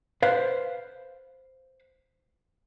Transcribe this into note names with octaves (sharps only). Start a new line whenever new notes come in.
B4 C5 F5